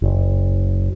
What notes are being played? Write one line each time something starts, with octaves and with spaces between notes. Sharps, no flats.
F#1